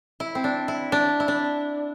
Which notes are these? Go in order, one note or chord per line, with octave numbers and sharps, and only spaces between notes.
E4
C4
D4
E4
D4
E4
D4